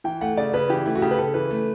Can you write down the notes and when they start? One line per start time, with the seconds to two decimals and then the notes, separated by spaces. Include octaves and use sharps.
0.04 E3 G5
0.21 A3 F#5
0.37 C#3 D5
0.53 C#3 B4
0.70 E3 G4
0.86 A3 E4
0.95 F#4
1.02 C#3 G4
1.11 B4
1.18 C#3 A4
1.34 E3 B4
1.51 A3